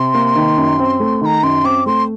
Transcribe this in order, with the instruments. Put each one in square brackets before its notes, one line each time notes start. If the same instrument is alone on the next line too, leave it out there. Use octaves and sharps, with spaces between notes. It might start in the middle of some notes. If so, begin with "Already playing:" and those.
Already playing: [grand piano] C3 [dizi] C6
[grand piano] A#3
D#3
F#2
C4
A3
[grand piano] D#3 [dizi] C6
[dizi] A#5
[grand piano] F#2 [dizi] C6
[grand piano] C4 [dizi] D6
[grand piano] A3 [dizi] C6